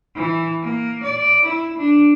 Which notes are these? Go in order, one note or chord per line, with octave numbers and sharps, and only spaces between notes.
E3
A#3
D5
E4
D4